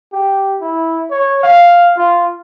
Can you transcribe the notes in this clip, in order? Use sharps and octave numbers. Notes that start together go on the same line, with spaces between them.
G4
E4
C#5
F5
F4